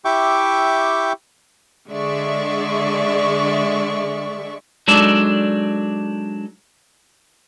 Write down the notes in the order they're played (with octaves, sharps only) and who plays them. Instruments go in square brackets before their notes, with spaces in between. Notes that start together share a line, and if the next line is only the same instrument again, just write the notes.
[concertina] E4 G4 E5 G5 C#6 D6
[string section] D3 G#3 D5 E5 C#6
[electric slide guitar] F#3 G#3 D4 D#4 A4 D5